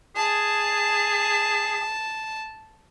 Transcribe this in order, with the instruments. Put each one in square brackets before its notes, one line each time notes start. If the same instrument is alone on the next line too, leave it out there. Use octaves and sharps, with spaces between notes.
[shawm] G#4 [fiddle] A5